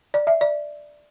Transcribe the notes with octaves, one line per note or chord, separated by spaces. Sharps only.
D5
E5
D5